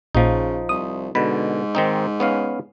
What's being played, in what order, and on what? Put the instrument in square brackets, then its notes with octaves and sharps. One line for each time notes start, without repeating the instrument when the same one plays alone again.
[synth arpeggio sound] A#1 A#2 [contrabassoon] C#3 [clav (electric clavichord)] F3 D#4
[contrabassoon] C2 [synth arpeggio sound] D#6
[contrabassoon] G#2 [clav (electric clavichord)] B2 D3 [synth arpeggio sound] B5
[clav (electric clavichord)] D#3 C4 D#4
B3 C#4 F5